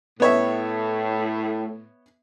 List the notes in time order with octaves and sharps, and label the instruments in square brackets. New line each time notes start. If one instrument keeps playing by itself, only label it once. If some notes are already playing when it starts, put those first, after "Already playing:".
[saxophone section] A2 [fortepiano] B3 C#5 E5